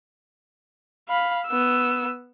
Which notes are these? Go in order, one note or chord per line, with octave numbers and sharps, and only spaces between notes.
F5 B5
B3 E6